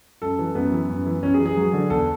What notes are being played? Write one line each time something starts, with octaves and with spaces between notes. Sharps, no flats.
F#2 A4
E3
F#2 B3
E3
F#2
E3
F#2 C#4
G#4
E3
G#4
F#3
D3
E2 A4